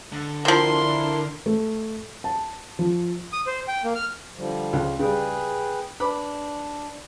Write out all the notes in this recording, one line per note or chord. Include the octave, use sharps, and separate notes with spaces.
D3
C3 F3 D4 E4 A#4 C6
A3
A5
F3
D#6
C5
G5
A#3
F6
D3 F3 G3
C#2 C#3
C#3 G3 G#4 B4 G5
D4 B4 B5 D6